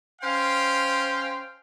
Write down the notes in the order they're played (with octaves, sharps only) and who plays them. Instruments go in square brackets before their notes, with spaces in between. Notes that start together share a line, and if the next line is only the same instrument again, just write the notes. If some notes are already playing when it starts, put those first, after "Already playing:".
[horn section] C#4 C5 F5 G5